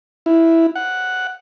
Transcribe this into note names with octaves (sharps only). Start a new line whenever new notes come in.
E4
F#5